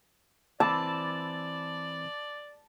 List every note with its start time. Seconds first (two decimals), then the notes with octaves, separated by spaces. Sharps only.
0.60 E3 C4 D5 A5 B5 D6 E6